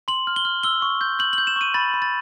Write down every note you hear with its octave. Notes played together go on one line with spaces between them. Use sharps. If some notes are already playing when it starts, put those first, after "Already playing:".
C6 F#7
F6
G7
F6
E6 G7
C#6
G6
G6 F#7
F#7
G6
E7
C#6 D#7
B5 A6
B5
A6